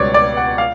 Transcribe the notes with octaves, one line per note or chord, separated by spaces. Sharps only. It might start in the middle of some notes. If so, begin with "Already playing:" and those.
Already playing: C#2 B2 G3 B3 C#5 D5
D5
F#5
F5